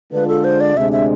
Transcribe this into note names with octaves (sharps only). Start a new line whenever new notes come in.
D3 G#3 D4 F4 B4
A4
C5
D5
D2 C3 G#3 D4 E5
E5